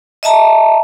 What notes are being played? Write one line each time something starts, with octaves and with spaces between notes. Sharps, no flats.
D#5 E5 A5 A#5